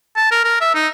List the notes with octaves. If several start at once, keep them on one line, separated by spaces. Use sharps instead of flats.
A5
A#4
A#4
E5
D#4